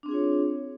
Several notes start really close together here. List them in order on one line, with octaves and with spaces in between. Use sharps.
D4 C4 G#4 F4 C#5